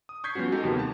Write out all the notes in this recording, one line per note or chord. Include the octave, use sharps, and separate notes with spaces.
D#6
C#6 G6 G#6 B6 C7
F3 G3 B3 C#4 F#4
G#3 D#4 F#4 G4 A4
D#2 C3 F3 G3 A#3 B3
A5